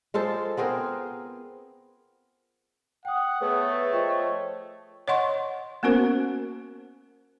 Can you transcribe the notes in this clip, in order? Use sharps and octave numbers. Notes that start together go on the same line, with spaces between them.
G#3 F4 A4 C5
B3 C4 G#4 A#4
F#5 G5 D#6
A3 B3 G#4 C#5 D#6
F3 D#5 G5 C#6
C#5 D#5 F#5 C6 C#6
A#3 B3 C#4 F#4 A#4 C5